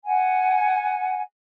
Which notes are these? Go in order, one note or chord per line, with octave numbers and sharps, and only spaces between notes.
F#5 G#5